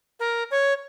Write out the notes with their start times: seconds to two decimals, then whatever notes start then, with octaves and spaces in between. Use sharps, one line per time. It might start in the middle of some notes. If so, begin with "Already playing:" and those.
0.20 A#4
0.51 C#5